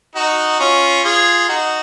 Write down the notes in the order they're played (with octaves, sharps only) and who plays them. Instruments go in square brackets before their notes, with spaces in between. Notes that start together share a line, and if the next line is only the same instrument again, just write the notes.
[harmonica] D#4 F#4
C#4 F4
F4 G#4
D#4 F#4